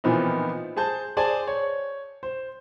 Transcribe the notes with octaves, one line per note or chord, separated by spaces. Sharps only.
A#2 E3 F3 B3 C4 D#4
G#4 C5 A5 G6
G#4 C5 D5 G#5 A5
C#5
C5